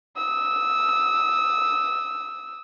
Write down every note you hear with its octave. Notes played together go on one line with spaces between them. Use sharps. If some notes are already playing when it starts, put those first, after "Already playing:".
D#6 E6